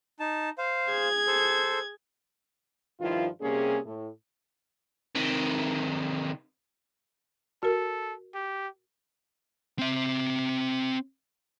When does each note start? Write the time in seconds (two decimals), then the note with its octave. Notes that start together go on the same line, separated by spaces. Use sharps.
0.20 D#4 A5
0.58 C5 F5
0.90 G#4 G#6
1.27 A4 C5
3.00 G2 D#3 F3 E4 F4
3.40 C3 G3 A#3 C#4 G#4
3.85 A2
5.15 C3 D#3
7.63 F#4 A4 A#4
8.34 G4
9.79 C4 E5